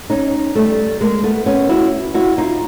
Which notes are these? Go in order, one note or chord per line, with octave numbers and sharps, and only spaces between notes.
C#4 D#4
G3 A3
G#3 A#3
A3 B3
B3 C#4
E4 F#4
E4 F#4
D#4 F4